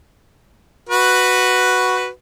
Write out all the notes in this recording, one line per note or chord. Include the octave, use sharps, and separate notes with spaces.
F#4 B4